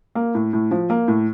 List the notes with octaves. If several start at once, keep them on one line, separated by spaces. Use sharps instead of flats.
A#3
A2
A2
F3
A#3
A2